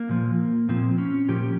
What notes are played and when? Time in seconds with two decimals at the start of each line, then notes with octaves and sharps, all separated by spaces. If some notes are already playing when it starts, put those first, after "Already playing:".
Already playing: A#3
0.09 A#2 F3
0.69 A#2 F3 C4
0.98 C#4
1.28 A#2 F3 G4